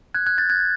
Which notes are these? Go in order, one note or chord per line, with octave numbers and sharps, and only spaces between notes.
F#6 G#6
F#6 G#6
G6 A6
F#6 G#6